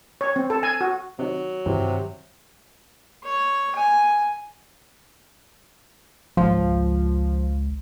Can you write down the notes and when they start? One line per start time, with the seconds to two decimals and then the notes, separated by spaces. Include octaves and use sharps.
0.21 C#5
0.36 C4
0.50 A4
0.63 G#5
0.81 F#4
1.19 C3 D#3 F#3
1.66 G2 C3 D#3 E3
3.24 C#5
3.75 G#5
6.37 G#1 C#2 F3